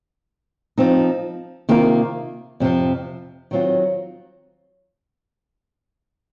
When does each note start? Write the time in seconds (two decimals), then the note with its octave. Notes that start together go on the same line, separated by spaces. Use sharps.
0.78 F3 C4 D#4
1.69 C3 D#3 A#3 F4 A#4
2.60 F2 C3 F3
3.51 D#3 F#3 C4 F4